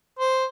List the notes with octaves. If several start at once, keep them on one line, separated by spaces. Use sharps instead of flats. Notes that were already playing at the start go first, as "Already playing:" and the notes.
C5